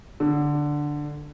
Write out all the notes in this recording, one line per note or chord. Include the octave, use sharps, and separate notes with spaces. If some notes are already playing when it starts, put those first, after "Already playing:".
D3